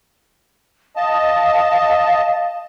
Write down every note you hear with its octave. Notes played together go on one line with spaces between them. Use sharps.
D#5 F5 A5